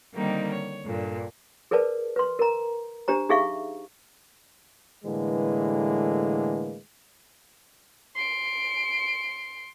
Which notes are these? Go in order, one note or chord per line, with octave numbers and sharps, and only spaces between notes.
D3 D#3 G3 A#3 C4 D#4
C#5
G2 A#2 D3
G#4 A#4 B4 D5 A5
B4 C6
A#4 A#5
D4 G4 C5 A#5
D#4 G4 G#4 E5 F5 C#6
A2 D3 E3 G#3 A#3 B4
C6 D7